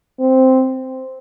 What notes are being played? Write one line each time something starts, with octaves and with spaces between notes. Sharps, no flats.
C4